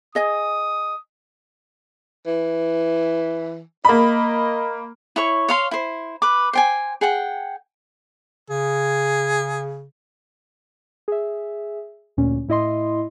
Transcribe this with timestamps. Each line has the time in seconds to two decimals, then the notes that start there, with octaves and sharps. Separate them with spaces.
0.15 G#4 D#5 G#5 D#6
2.27 E3
3.85 A#3 D#5 B5
5.16 E4 C#5 C#6
5.49 C#5 F5 C6
5.71 E4 C5
6.22 B4 D6
6.53 C5 G5 G#5
7.01 G#4 F#5 G5
8.50 C#3 G#4
11.08 G#4 E5
12.17 D2 A#2 C#4
12.48 A2 E4 D#5 C6